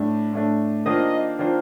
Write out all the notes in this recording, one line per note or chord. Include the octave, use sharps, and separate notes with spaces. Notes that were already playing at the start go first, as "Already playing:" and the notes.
Already playing: A2 A3 D4
A2 A3 D4
D#3 A#3 D4 F4 C5 D#5
D#3 A#3 D4 F4 C5